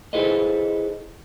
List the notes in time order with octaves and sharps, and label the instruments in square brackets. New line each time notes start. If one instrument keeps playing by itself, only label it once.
[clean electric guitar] E4 G#4 A4 B4 C5 D#5